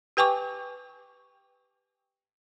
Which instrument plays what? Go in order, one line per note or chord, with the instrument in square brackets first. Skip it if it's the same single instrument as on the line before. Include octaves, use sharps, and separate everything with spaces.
[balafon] G4 B4 G5 G#5 C#6 D6